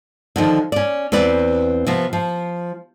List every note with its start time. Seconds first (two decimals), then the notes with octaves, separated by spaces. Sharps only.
0.36 D3 D#3 F3
0.72 C#4 D5
1.12 E2 C4 B4 D5
1.87 C3 F3 B3
2.13 F3